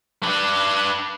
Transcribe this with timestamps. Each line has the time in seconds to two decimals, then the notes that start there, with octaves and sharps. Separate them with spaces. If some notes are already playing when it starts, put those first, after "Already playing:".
0.23 D4 B4